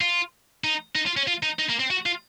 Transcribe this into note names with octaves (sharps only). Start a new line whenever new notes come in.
F4
D#4
D#4
F4
C#4
F4
D#4
D#4
A#3
C4
F#4
F4